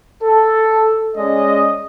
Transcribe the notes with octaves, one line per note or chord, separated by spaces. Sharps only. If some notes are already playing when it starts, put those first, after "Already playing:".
A4
G#3 C#4 D5 D#5